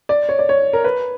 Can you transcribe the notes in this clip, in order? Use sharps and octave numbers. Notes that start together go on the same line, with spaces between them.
D5
C#5
D5
C#5
A#4
B4